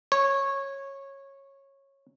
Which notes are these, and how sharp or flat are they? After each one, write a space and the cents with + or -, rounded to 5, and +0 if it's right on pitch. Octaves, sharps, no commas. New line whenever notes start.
C#5 -15